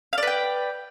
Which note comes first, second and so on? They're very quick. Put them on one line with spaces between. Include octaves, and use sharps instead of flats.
F5 D5 B4 G5